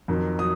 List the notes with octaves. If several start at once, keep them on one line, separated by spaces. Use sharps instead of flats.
F2 D#3 F#3
F#3 D#6